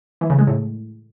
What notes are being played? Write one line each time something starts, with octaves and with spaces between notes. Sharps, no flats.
E3
C#3
G#3
A2